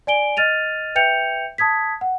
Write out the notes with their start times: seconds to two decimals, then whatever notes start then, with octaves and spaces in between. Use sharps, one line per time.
0.07 D5 G#5 D7 G7
0.37 D#5 F6 A6 D#7 F7
0.95 B4 E5 G5 G6 C#7 F7
1.58 A5 D#6 G#6 B6
2.01 F#5